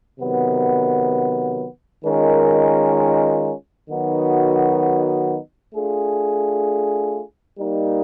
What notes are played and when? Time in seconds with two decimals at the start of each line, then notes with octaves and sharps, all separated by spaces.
0.20 C3 D#3 F#3 B3
2.05 D#3 G#3 C#4 F4 A#4
3.90 D#3 F#3 B3 D#4 F#4
5.75 A3 D4 F4 G#4
7.59 G3 A#3 D#4